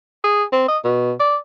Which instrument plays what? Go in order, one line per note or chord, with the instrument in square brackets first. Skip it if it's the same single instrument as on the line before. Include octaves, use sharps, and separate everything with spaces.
[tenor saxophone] G#4
C4
D#5
B2
D5